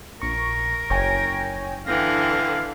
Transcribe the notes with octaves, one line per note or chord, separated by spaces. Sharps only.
A#1 A#4 C#6
F#1 C#5 G5 G#5
D3 E3 F5 G5 A#6